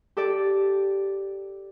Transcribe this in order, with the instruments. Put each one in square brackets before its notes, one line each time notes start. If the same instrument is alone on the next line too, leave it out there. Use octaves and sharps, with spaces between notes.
[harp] G4 A4 D5